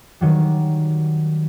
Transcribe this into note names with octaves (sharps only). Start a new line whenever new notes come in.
D#3 F#3 G3